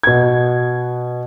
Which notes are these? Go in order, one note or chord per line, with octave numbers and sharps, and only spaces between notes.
B2 G#6